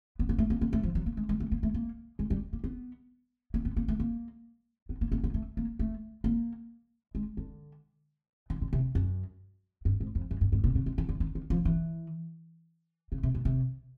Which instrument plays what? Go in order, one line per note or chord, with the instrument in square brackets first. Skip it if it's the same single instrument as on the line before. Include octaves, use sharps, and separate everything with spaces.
[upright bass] B3
A#3
A3
A#3
A#3
A3
F3
F#3
A#3
G#3
G#3
A3
A#3
A3
A#3
G#3
G3
A#3
B3
A#3
B3
A#3
A3
A#3
B3
A#3
A#3
A#3
A3
A#3
A3
A#3
G#3
D3
D#3
D3
C3
F#2
G2
G#2
F2
F#2
G2
G#2
A#2
C#3
D3
D#3
D3
D#3
D#3
F3
E3
C#3
C3
B2
C3